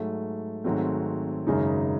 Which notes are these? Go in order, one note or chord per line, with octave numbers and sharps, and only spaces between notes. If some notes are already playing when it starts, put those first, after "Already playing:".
Already playing: G#2 F#3 A3
G#1 G#2 F#3 A3 C4
G#1 F#2 C#3 G#3 D#4